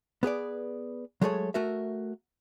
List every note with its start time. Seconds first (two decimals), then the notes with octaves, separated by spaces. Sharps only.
0.23 B3 G#4 B4 D5
1.21 F#3 G#3 A3 G#4 A4 C#5
1.54 A3 F#4 A#4 E5